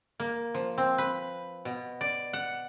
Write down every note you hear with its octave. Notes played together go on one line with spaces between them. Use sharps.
A#3
F3
C4
B4
B2
D5
F#5